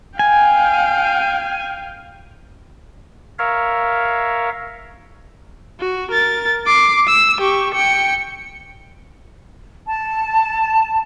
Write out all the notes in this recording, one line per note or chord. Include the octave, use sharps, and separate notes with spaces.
F5 G5 G#5
A#4 C#5 E5 F5
F#4
A#4 A6
D6 C7
E6
G4 C#6
G5 C#7
A5